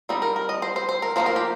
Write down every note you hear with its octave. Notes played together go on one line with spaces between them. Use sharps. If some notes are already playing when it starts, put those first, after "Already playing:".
G3 C4 D#4
A#4
A#4
D#5
C5
C5
C5
A#4
F3 A#3 D#4 C5
A#4
G4